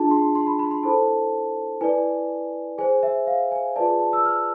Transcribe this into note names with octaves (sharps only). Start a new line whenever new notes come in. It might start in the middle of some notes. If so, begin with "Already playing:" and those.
Already playing: D4 F4 G#4 A5
C6
C6
B5
B5
C6
E4 A4 C5 A5
E4 B4 D5 G#5
G#4 C5 G#5
E5
F5
G#5
F4 G#4 B4 D5 A5
A5
E6
F6